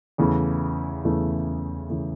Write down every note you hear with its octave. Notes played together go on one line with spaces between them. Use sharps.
E2 C#3 E3 A3
E2 C#3 E3 A3
C#3 E3 A3